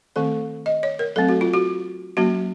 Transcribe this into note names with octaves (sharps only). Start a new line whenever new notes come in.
D#3 A3 C4 A4
D#5
C#5
A#4
F#3 A3 C4 A4
F#4
F4
F#4
F#3 A#3 C#4 F#4